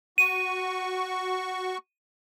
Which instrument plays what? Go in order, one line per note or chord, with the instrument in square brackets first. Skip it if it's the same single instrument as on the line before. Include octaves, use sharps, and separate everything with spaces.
[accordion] F#4 C#6 [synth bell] D#7